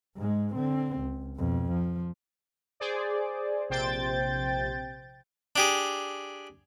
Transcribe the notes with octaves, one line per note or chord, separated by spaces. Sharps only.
G#2 G#3
D3 C4
C#2
F2 B2
F3
G#4 C5 D5
A#1 C3 C5 G5 G6 A6
D4 G4 G#4